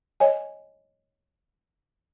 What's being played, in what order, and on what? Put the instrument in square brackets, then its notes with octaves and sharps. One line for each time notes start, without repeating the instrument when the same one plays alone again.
[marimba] C#5 D#5 G#5